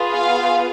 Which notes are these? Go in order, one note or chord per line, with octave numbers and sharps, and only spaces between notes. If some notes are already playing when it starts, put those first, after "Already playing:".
Already playing: B3 F4 G#4
F5